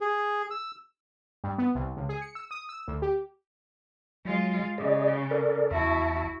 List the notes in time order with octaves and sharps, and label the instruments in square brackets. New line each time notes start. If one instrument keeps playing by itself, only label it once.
[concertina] G#4
E6
[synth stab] G2
B3
C2
C#2
G#4
C#7
E6
D#6
E6
D2
G4
[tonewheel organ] F#3 [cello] G#3 F4
[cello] C#3 [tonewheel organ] G#4 D5 D#5
[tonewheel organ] A4 A#4 D5
[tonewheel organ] E2 E5 A5 [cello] E4 F#4